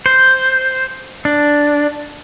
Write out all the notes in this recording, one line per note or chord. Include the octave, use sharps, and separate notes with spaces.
C5
D4